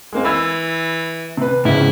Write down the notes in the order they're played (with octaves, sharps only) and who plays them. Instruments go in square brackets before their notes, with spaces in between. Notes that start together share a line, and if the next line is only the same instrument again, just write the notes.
[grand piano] G#3 A#3 C4
[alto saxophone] E3 [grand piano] B5 E6 G#6
[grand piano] C3 B4
[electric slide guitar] G#2 C#3 [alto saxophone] E4